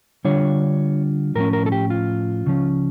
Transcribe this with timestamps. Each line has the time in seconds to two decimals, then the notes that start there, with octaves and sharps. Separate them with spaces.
0.25 D3 G3 D4 F4 C#5
1.35 A2 F3 C#4 A#4
1.53 A#4
1.66 A4
1.72 G4
1.90 F4
2.46 C#2 C#3 F3 C#4